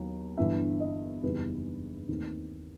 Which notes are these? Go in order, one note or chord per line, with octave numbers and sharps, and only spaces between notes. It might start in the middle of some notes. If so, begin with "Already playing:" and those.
Already playing: D#2 D#3 F#3 B3
G1 G2 E3 B3 E5
D#5
F#1 E2 D#3 G3 B3 B4
D#2 D#3 A3 C4